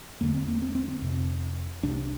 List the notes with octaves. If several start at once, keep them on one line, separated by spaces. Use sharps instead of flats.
E2 D3 A#3
C4
A#3
C4
C4
C4
F2 C3
C2 C3 D4